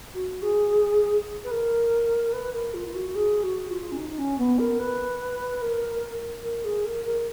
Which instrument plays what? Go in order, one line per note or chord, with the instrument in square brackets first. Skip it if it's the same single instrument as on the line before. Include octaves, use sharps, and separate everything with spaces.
[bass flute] F#4
G#4
B4
A#4
B4
A#4
F4
F4
F#4
G#4
F#4
F4
C#4
D#4
D#4
C#4
B3
A#4
B4
A#4
A#4
G#4
A#4
A#4